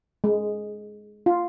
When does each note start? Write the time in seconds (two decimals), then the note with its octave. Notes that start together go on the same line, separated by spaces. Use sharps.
0.24 G#3
1.26 F4